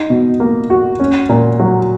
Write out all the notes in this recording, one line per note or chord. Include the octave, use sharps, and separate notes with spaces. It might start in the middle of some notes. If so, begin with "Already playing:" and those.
Already playing: D#4
B2
A#3
F#4
C#4
A#2
F#3